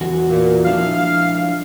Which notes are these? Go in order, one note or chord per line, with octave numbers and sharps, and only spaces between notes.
E2 F#4
A#2
F3 D4 E4 F5